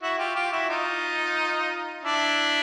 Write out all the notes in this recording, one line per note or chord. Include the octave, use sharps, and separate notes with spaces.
E4 F#4
F4 G4
F4 G4
E4 F#4
D#4 F4
D4 E4